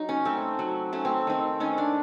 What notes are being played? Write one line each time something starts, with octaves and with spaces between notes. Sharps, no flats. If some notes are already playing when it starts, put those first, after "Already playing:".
Already playing: F#3 D#4
C#4
A3 C4
F#3
A3 C#4
C4
D#3 C4
D#3 C#4
D4